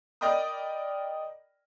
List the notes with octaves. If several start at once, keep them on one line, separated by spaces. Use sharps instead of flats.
A#4 D5 D#5 G5 B5 D#6